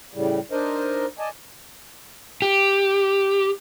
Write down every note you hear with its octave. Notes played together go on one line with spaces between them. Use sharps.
A2 C#3 G3
D4 D#4 A#4 C5 D#5
D5 D#5 G#5 A5
G4